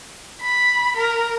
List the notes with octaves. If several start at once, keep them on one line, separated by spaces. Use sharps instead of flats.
B5
A#4